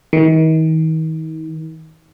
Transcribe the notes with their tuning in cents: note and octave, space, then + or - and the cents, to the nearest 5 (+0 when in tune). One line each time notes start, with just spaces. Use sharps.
D#3 +40